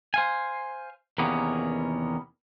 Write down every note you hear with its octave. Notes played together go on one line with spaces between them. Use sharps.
C5 F5 G#5
E2 C3 D#3 A#3 B3 C#4